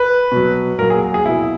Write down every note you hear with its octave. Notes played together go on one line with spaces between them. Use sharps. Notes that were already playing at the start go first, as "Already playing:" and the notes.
Already playing: B4
B2 F#3
A#2 F#3 A#4
G#4
G#4
B2 F#3 E4